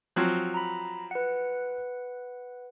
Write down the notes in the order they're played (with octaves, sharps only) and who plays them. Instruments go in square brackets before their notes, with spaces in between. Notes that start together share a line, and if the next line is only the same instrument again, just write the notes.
[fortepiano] F3 F#3 C4
[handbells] A#5 B5
B4 F#5